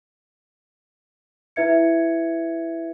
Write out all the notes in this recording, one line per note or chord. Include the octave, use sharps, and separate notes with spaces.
E4 B4 E5 G#6 C#7